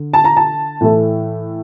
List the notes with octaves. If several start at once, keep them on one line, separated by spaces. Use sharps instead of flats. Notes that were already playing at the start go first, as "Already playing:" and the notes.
Already playing: D3
A5
A#5
A5
A2 E3 A3